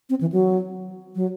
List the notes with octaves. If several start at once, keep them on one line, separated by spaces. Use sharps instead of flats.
C4
E3
F#3
F#3